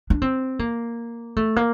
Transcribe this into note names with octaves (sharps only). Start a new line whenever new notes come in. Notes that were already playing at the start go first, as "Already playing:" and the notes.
D4
C4
A#3
A3
A#3